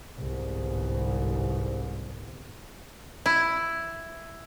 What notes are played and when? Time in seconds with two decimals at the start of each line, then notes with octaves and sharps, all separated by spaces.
0.17 G1 C2 G#2
3.26 E4